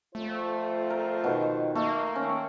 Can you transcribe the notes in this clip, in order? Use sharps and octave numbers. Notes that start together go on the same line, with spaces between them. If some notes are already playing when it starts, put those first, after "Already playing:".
F2 A3 F4 C5
A#4
B2 D#3
A3 A#3
D#3 C4 C#4